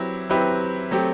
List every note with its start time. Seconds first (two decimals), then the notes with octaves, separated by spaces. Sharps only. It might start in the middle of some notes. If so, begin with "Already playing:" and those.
Already playing: F#3 C4 E4 G4 B4
0.29 F#3 C4 E4 G4 B4
0.91 F#3 A3 C4 G4